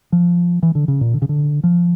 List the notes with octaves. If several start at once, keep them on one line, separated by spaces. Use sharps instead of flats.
F3
E3
D3
C#3
A#2
D3
C#3
D3
F3